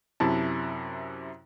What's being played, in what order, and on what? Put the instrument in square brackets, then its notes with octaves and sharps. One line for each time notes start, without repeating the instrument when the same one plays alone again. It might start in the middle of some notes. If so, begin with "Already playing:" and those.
[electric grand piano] F#2 C3 E4 A5